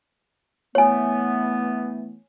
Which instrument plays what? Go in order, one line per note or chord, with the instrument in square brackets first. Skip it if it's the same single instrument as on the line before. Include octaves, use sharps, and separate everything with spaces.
[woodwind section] E3 A3 B3 [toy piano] C#5 G#5